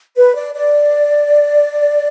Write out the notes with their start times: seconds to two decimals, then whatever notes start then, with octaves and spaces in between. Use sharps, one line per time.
0.16 B4
0.35 D5
0.54 D5